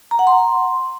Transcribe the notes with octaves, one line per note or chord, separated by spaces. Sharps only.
A#5
F#5
C6